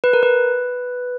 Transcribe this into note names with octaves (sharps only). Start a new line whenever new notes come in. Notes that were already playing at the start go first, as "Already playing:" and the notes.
B4
A#4
B4